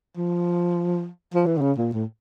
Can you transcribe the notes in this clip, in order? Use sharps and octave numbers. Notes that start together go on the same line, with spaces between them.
F3
F3
E3
D3
C#3
A#2
A2